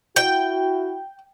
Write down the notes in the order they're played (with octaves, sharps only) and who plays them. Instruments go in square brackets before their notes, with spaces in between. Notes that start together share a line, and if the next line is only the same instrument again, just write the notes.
[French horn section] E4 F#4 [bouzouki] G5